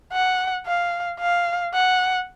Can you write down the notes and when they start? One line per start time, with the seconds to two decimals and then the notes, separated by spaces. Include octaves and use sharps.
0.13 F#5
0.66 F5
1.20 F5
1.74 F#5